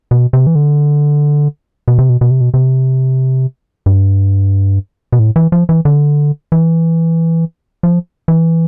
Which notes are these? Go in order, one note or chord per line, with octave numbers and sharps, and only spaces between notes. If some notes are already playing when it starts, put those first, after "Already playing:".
B2
C3
E3
D3
B2
C3
B2
B2
C3
B2
C3
G2
B2
A2
E3
F3
E3
D3
E3
F3
E3